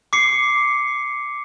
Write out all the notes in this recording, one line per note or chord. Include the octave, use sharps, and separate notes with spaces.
D6 C7 C#7